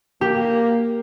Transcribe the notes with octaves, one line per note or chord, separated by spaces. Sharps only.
A#3 G4